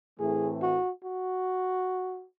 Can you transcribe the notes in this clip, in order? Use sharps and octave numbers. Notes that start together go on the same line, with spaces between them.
A2 E3 A3 C4 G#4
F#4
F#4